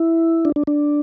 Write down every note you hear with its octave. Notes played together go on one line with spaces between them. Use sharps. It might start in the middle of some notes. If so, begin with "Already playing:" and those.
Already playing: E4
D4
D4
D4